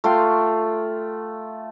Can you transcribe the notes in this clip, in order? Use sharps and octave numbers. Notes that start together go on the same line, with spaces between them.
A3 F4 G5 C6